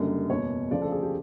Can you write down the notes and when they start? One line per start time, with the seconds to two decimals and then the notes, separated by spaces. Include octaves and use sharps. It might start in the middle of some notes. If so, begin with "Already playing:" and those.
Already playing: F#1 F#2 D3 G3
0.29 F#1 E2 B2 C#5
0.71 D2 C#3 F3 D5
0.82 A4
0.92 G#4
1.02 G4